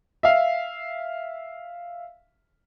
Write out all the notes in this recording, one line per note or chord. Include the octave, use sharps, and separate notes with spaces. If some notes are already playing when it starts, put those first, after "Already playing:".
E5 F5